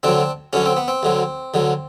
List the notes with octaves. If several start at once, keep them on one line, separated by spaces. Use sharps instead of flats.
D2 D3 F#3 C4 D4
D2 D3 F#3 C#4
C4
B3
C4
D2 D3 F#3
D2 D3 F#3